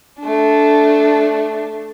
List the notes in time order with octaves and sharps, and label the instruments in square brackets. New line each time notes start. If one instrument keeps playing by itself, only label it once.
[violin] A3 D4